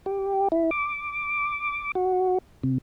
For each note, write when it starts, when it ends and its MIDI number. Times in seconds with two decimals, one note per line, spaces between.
0.06 0.48 67
0.52 0.70 64
0.71 1.92 86
1.95 2.38 66
2.63 2.78 48